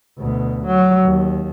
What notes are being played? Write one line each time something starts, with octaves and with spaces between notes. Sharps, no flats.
D2 B2
F#3
D#2